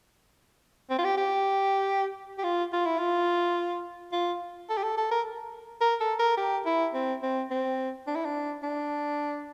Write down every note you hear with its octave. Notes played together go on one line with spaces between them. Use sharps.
C4
F4
G4
G4
G4
F4
F4
E4
F4
F4
A4
G4
A4
A4
A#4
A#4
A4
A#4
G4
E4
C4
C4
C4
D4
E4
D4
D4